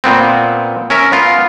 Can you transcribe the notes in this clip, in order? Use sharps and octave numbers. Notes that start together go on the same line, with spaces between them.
A#2 B3 C4
C#4 A#4 E5
B3 F4